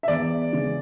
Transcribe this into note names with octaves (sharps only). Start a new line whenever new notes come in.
E5
E2 D5
C#3